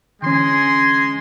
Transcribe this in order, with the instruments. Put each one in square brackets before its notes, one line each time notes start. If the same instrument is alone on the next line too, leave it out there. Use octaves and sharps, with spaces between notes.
[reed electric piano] D3 E3 C#4 [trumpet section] G#3 G#5 C6